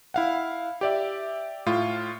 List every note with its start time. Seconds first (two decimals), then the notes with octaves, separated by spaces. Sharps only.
0.14 E4 F5 F#5
0.81 G4 D5 E5
1.66 A2 F4